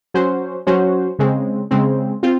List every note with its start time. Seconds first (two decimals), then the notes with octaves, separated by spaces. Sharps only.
0.14 F#3 C#4 F#4 C5
0.67 F#3 C#4 F#4 C5
1.19 C#3 G#3 C4
1.71 C#3 G#3 C4
2.23 C4 F4